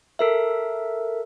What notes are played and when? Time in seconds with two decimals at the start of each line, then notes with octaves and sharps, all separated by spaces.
0.19 A4 A#4 E5